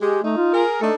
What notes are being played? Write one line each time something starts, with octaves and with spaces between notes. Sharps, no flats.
G#3 G4
A3 D#4
F4
G#4 A#4
A3 D4 D#4 A4